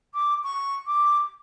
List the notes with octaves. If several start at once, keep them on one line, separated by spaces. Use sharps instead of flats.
D6
C#6
D6